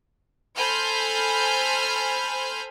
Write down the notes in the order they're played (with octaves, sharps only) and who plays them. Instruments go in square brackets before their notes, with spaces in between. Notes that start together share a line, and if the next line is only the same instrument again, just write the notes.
[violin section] A4 C5 G#5 B5 F6 G6